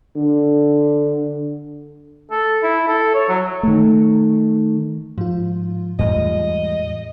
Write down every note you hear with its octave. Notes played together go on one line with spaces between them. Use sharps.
D3
A4
E4
A4
C#5
F#3
D#3 A3
G#2 F3 F4
E2 A2 G3 G#3 D#5